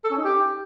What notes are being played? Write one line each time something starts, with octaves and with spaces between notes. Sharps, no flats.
A4
C#4
D#4
G4